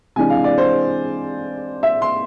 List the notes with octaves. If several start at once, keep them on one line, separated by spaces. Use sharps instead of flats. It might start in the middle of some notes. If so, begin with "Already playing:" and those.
C3 E3 G#3 D4 G#5
F5
D5
C5
E5
C6